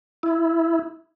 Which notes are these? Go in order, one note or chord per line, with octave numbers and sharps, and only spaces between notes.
E4